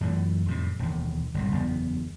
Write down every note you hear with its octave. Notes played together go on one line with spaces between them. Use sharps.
F#2 E3 G#3 A3
F2 A2 C3
E1 D#2
G1 C2 A#2
F#1 E2 B3